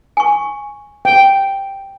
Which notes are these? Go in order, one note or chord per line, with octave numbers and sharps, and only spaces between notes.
G#5 C#6
G5